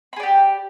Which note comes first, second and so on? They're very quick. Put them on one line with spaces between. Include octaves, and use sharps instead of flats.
B5 G#4 D5 G4